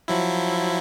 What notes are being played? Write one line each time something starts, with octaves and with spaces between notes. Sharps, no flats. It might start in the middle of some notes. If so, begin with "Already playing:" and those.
F3 F#3 E4